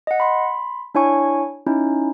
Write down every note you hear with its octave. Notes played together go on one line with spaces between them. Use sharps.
D#5 F#5
B5 C6
D4 E4 C#5 G#5 C#6
C#4 D#4 E4